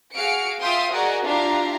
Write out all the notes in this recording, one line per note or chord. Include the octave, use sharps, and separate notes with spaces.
F#4 G#4 F5 F6 C#7 D7
F4 E5 F5 G5 C6 D#6
F#4 G#4 A#4 D5 D#5
D4 E4 F4 G4 F5 A#5